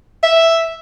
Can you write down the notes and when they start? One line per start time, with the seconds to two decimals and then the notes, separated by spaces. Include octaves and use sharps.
0.23 E5